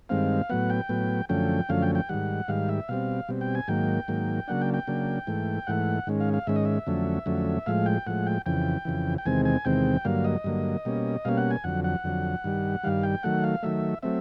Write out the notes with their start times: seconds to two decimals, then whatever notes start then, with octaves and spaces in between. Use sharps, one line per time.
0.09 G2 D#3 G#3 C4 F5
0.49 A2 F#3 B3 F#5
0.70 G5
0.89 A2 F#3 B3
1.29 F#2 D3 F3 A3 C#4 G5
1.69 F#2 D3 F3 A3 C#4 F5
1.82 G5
1.95 G5
2.09 G#2 D#3 G3 F#5
2.48 G#2 D#3 G3 F5
2.69 E5
2.89 B2 G3 C4 F5
3.29 B2 G3 C4
3.41 G5
3.55 G#5
3.68 G#2 D#3 F#3 A#3 G5
4.08 G#2 D#3 F#3 A#3
4.48 C#3 F#3 A#3 D4 F#5
4.62 G5
4.74 G5
4.87 C#3 F#3 A#3 D4
5.27 G#2 E3 A3
5.67 G#2 E3 A3 F#5
6.07 G#2 D#3 G#3 C#4
6.20 F5
6.33 F5
6.47 G#2 D#3 G#3 C#4 E5
6.56 D#5
6.65 E5
6.87 F2 D3 F#3 A3 C#4
7.26 F2 D3 F#3 A3 C#4
7.66 A2 F3 G#3 F5
7.86 G5
8.07 A2 F3 G#3 F#5
8.27 G5
8.46 F2 C#3 E3 G5
8.85 F2 C#3 E3
9.18 G5
9.25 E2 C3 D#3 G#3 C4 G#5
9.45 G#5
9.65 E2 C3 D#3 G#3 C4 G5
10.05 G2 D3 F#3 A#3 F5
10.24 D#5
10.44 G2 D3 F#3 A#3
10.85 B2 G3 A#3 C#4
11.25 B2 G3 A#3 C#4 F5
11.37 F#5
11.51 G#5
11.64 F2 D3 F#3 F#5
11.84 F#5
12.04 F2 D3 F#3
12.44 G2 D#3 G3
12.83 G2 D#3 G3 F5
13.03 G5
13.23 D#3 F#3 A3 F#5
13.44 F5
13.63 D#3 F#3 A3 E5
14.02 F#3 A3 C4 E5